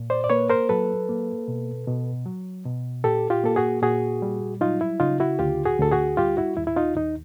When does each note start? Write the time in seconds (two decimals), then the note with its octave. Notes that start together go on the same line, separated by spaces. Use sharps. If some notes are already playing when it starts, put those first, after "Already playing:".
Already playing: A#2
0.10 C5 D5
0.24 D5
0.30 A#3 B4 C#5
0.50 A#4 C5
0.69 F#3 A4 B4
1.09 A#3
1.48 B2
1.87 B2
2.26 F#3
2.66 B2
3.04 A#2 G4 A4
3.30 F4 G4
3.44 A#3 A4
3.56 F#4 G#4
3.82 A#2 F#4 G#4
4.22 G3
4.61 F#3 D#4 F4
4.81 E4
5.00 C#3 D#4 F4
5.20 E4 F#4
5.39 D2 F4 G4
5.65 F#4 G#4
5.79 D2 A4
5.92 F#4 G#4
6.17 G3 F4 G4
6.37 E4 F#4
6.57 D#2 E4
6.67 E4
6.76 D#4 F4
6.96 D#2 D#4